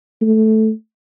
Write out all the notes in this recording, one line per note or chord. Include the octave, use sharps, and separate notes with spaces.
A3